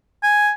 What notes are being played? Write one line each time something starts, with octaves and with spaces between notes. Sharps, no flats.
G#5